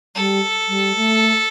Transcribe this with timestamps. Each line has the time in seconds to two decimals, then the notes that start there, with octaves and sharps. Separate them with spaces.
0.15 G3 A4
0.68 G3
0.96 A3